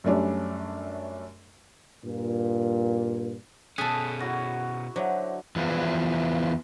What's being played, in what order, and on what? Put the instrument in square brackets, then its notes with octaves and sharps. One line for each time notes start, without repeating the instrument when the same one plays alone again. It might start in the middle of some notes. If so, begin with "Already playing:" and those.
[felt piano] F#2 G3 A3 C#4 D4
[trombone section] G2 A#2
[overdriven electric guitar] B2 C#4 [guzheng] G#4 A4 [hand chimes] F#6 B6
[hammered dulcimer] F#3 E4 F#4 [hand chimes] A#6
[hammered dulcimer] D3 D6 [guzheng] F#3 [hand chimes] C5 C#5 E5
[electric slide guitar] E2 E3 F3